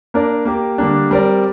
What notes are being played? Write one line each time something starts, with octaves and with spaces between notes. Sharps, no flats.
A#3 D4 A#4 D5
A#3 G4 A#4
D3 G3 A#3 D4
G3 C4 A#4 D5